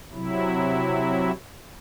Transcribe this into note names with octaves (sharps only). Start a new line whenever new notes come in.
C3 F#3 E4